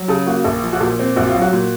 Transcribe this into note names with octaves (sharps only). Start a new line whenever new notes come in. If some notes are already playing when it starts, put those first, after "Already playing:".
Already playing: F#3
C#3 A4
A#3 F#4
A#1 A4
F3
F#4
A#2 A4
C4
A#1 F#4
F4
F#3
F#4
A#2